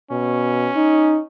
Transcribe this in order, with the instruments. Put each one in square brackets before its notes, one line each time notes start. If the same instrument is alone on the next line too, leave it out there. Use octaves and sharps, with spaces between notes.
[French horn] B2 [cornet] C#4
[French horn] D#4